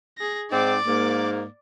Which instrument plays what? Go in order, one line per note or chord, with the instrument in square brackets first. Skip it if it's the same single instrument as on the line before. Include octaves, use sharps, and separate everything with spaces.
[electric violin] G#4 A#6
[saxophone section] G#2 C4 D#4 [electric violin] D5 D6
[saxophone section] G#2 A#3